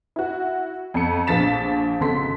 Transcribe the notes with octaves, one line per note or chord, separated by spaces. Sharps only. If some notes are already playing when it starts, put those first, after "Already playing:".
E4 F#4
F2 C#7
A#1 F3 A6 B6 E7
G#1 C#3 A4 C6 B6